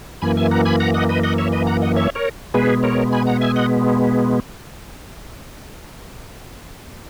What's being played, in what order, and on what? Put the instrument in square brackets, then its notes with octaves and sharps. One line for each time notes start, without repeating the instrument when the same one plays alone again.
[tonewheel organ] F#2 E3 A#3 G#5 B5
E5 G#5
F#5 A#5
G#5 B5
F#5 A#5
D#5 F#5
B4 D#5
D#5 F#5
C#5 E5
B4 D#5
F#5 A#5
D#5 F#5
C#5 E5
A#4 C#5
B2 G#3 B3 G#4 B4
A#4 C#5
G#5 B5
F#5 A#5
E5 G#5
D#5 F#5